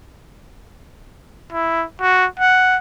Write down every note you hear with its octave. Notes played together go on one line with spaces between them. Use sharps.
E4
F#4
F#5